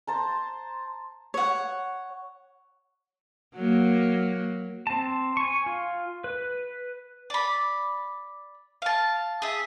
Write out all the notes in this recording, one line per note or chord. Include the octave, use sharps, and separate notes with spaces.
C5 A5 A#5
C#5 F#5
F#3 A#3
C4 A5
G#5 C#6
F4
B4
D5 B5
F5 A5
G#4 E5